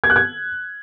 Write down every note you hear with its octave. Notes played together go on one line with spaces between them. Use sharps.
G#6
F#6
G#6